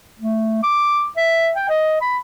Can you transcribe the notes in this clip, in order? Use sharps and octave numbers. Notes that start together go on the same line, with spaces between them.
A3
D6
E5
G5
D#5
B5